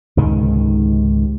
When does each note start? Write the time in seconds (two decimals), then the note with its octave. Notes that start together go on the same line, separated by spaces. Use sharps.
0.17 C#2 G#2 C3 D#3